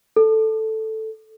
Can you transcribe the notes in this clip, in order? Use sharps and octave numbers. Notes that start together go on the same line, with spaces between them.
A4